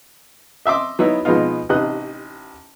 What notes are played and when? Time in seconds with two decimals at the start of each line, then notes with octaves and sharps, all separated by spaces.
0.66 D#5 E5 C6 D6
0.99 F#3 B3 D#4 E4
1.25 B2 F3 G#3 B3 D#4 F4
1.69 A1 C3 D#4 D#5 F#6